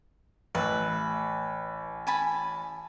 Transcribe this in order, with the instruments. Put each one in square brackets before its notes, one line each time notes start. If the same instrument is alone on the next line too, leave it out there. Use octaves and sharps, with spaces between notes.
[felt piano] A1 [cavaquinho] B4 E5
[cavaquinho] G#5 A5 B5